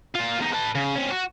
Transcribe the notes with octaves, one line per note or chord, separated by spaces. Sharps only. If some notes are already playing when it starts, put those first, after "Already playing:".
A#2 F4
E2 D#4
B4 A5
C#3
C4 C#4
F#4